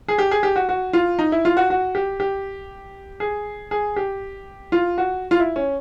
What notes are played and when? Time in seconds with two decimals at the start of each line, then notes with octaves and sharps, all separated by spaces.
0.08 G#4
0.18 G4
0.31 G#4
0.43 G4
0.56 F#4
0.69 F#4
0.93 F4
1.19 D#4
1.32 E4
1.45 F4
1.57 F#4
1.70 F#4
1.95 G4
2.20 G4
3.20 G#4
3.71 G#4
3.96 G4
4.72 F4
4.98 F#4
5.31 F4
5.40 E4
5.56 C#4